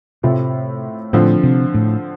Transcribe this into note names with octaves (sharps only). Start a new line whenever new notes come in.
A2 C3 A3 C4 F4
A2 D3 F3 C4
C3
A2